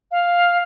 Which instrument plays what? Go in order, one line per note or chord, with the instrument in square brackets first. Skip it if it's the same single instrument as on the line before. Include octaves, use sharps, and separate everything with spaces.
[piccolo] F5